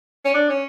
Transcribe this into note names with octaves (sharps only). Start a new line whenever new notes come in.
C#4
D4
C#4